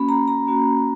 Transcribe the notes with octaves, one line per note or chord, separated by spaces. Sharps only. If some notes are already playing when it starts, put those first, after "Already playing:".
Already playing: A#3 C#4 F#4 B5
A#5
A#5
A#3 C#4 F#4